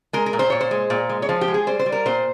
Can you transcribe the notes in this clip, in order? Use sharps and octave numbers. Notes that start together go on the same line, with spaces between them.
G#3 A#4
A#4
A#2
C5
A#2 C#5
C5
G#3
A#2
G#3
C#5
F3 C5
G4
G#3
G#4
G3 C5
C5
G3
A#4
A#2 C5